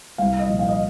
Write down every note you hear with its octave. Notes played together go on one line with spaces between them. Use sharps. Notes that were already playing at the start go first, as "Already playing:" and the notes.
C2 F5
D#5
A#2 F3
F5
D#5